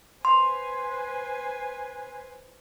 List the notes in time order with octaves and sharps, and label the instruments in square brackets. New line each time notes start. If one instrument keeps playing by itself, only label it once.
[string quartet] B4 C5 G#5 [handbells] C6